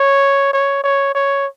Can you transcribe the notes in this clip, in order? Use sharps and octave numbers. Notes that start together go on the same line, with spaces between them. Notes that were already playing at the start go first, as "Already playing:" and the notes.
Already playing: C#5
C#5
C#5
C#5